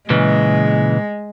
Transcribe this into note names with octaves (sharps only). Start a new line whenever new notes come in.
A#2 C#3 E3 G#3